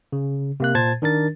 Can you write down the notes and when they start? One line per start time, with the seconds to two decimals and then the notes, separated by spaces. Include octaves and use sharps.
0.12 C#3
0.60 C3 A#3 F#6
0.75 A#2 C5 A5 G#6 A6
1.02 D#3 D4 A#4 A6